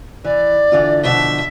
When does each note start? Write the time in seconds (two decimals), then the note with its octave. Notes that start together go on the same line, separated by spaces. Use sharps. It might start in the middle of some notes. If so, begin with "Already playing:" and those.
0.24 E3 D5
0.72 D3 E3 F4
1.03 B2 D3 F3 E5